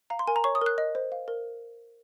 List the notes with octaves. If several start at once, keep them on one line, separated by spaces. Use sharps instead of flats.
F5 A#5
C6
A#4 G#5
A#5
C#5 C#6
D#6
A#4 F#6
D#5
C5
F5
A#4